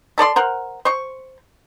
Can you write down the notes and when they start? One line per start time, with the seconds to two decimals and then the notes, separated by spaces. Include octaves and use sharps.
0.18 A3 A4 D5 C6
0.36 A#4 C5 F#5
0.85 C5 C#6